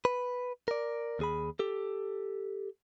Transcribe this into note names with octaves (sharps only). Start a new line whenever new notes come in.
B4
A#4 D5
D#2 G#4 B5
G4 A4